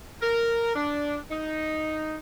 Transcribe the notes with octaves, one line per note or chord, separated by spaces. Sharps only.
A#4
D4
D#4